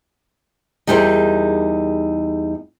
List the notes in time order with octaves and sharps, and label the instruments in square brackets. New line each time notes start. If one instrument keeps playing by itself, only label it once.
[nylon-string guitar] E2 G3 D#4 G#4 A#4 C5